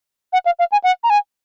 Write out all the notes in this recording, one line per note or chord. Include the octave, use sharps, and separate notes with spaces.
F#5
F5
F5
G#5
F#5
A#5
G#5